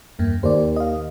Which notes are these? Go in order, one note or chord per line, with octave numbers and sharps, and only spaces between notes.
E2 G2 A#3
D#2 C5 D5
D#5 F5